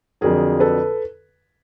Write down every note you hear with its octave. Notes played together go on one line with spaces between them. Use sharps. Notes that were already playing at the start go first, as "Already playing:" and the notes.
F2 D3 F#3 G#4 A#4
A4 B4